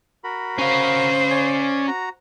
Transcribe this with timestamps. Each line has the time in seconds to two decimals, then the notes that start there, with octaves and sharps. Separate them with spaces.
0.24 F#4 A#4 B5
0.59 C#4 C5 F5
1.31 C#5 D5 G#5
1.88 F#4 A#5